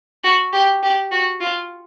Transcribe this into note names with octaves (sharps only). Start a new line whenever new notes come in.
F#4
G4
G4
F#4
F4